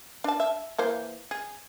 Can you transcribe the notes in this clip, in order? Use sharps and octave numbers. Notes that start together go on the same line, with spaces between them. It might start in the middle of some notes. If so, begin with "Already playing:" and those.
D4 A5
E5
E3 A#3 C5
G#4